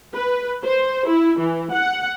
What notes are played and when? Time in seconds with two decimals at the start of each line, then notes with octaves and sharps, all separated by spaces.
0.14 B4
0.64 C5
1.08 E4
1.40 E3
1.73 F#5